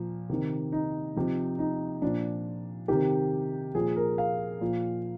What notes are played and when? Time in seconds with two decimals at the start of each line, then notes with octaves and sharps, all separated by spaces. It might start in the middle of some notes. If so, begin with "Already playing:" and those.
Already playing: A#2 F3
0.30 C3 D#3
0.72 D#4
1.16 C3 F3
1.59 D#4
2.02 A#2 F3 D4
2.88 C3 D#3 G4
3.75 A#2 F3 G#4
3.96 A#4
4.18 F5
4.61 A#2 F3